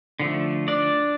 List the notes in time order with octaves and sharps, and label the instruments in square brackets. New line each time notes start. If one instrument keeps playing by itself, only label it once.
[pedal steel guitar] D3 F3 A3
D4 D5